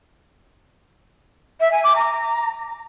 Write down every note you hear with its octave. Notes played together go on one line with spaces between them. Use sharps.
E5
G#5
D6
A#5